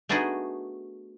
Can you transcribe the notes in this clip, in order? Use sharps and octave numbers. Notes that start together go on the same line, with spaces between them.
A3 B3 D4 D#4 F#4 G#4